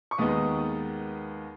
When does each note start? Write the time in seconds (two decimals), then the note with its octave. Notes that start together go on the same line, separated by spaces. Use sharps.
0.11 C#6
0.18 D#2 D#3 G#3 B3 D#4 D#6